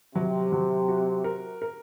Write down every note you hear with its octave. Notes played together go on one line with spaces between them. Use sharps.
C3 F#3
F#3
F#4
A#4
A#4